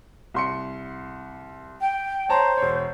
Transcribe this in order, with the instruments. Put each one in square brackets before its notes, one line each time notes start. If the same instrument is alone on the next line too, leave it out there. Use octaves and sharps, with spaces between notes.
[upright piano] C2 C6 C#7
[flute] G5
[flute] C5 [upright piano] C#5 A5 A#5
[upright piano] E1 C#5